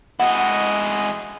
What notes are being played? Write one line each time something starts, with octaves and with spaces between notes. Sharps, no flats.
G#3 E4 F#4 D#5 F#5